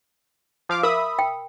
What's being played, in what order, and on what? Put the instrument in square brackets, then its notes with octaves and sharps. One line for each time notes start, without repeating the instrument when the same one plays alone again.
[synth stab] F3 F5 D6
[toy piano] A#4 [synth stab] E5 B5 D#6
[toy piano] G5